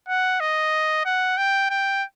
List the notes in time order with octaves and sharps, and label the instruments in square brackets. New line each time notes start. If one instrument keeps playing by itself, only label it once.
[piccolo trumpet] F#5
D#5
F#5
G5
G5